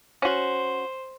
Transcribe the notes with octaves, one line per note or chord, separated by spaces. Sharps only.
C#4 F#4 C5